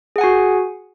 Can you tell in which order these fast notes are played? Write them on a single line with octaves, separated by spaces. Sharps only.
G#4 F#5 G#5 F#4